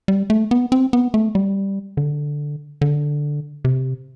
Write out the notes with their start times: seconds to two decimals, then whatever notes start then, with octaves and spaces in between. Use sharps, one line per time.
0.08 G3
0.30 A3
0.51 B3
0.72 C4
0.93 B3
1.14 A3
1.35 G3
1.97 D3
2.81 D3
3.65 C3